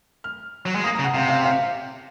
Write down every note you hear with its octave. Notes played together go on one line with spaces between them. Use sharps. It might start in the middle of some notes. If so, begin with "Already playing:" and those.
F6
F#3
G#3
A#3 D#6
A#5
C#3
F#5
C3 F5
F5
F5